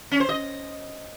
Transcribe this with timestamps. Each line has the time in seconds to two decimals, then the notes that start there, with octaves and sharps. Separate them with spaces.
0.11 C#4
0.20 C5
0.29 D#5